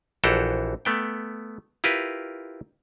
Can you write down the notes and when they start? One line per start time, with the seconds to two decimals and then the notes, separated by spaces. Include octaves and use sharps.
0.24 A#1 E3 F#4 G4 A4 C5
0.85 A3 B3 G5
1.84 E4 F4 G4 A#4 B4